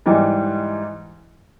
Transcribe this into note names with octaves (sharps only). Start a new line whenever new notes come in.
G#2 E3 G3